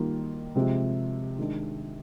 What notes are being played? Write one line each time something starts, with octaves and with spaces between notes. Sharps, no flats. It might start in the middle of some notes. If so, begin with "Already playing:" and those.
Already playing: D#3 G3 A#3 F4
C3 F3 G#3 C4 G4
D#3 G#3 D4